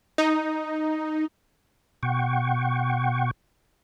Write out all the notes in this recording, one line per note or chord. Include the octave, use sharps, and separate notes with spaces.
D#4
B2 F#5 G5 C#6